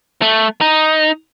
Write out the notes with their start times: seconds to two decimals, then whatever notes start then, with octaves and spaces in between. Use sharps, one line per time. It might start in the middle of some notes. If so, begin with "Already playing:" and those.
0.22 A3
0.61 D#4